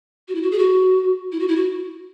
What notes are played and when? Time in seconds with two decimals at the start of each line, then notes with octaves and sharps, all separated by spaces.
0.28 F#4
0.35 E4
0.42 F#4
0.52 G#4
0.59 F#4
1.32 E4
1.40 F#4
1.48 E4
1.56 F#4